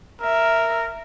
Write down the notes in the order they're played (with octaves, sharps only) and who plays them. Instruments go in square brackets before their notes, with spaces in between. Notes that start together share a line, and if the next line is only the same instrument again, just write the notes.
[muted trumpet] A#4 [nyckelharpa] E5